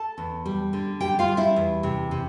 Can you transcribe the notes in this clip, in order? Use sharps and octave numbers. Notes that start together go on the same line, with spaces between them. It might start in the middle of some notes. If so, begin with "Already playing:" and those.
Already playing: A4 A5
E2
G3
D3
G3 G4 G5
F4 F5
G3
E4 E5
E2
C3
C3